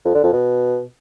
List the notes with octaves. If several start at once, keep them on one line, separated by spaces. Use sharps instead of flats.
F2
D3
F2
B2